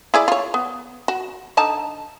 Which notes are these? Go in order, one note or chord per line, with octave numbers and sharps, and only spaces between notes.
E4 G#4 D5
F4 C#5
B3
F#4
D3 D#4 A5